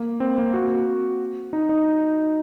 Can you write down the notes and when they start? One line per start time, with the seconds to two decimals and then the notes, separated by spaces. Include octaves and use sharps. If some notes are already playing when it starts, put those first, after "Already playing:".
Already playing: A#3
0.20 C4
0.38 A#3
0.54 F#4
1.53 D#4
1.69 D#4